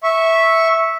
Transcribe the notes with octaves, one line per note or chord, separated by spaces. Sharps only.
E5 C#6